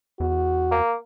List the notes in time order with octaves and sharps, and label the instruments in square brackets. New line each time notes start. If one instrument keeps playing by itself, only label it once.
[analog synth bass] E2 [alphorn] F#4
[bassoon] A#3